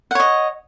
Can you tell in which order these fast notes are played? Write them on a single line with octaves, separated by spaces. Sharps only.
F#5 C#5 D#5